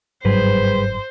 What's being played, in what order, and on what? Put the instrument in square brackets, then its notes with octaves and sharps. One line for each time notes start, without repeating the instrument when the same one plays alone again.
[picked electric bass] G1 G#2 F#3 [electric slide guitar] G3 G#4 B4 [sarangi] C5